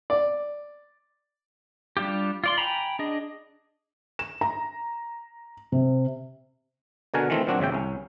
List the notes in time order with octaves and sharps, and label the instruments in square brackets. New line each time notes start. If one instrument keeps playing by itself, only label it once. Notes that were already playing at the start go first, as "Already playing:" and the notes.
[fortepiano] D5
[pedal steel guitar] G3 D4 F4 G4
F4 D5 C6
G5 G#5 A#5 B5
D4 G#4 D#5
[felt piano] E7
A#5
C3
[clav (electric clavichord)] B2 D3 F#4 A#4 G#5
D#3 E3 A3 C4
A#2 F#3 C4 D4 F#4
G#1 C#3 E5 G5
C2 C#4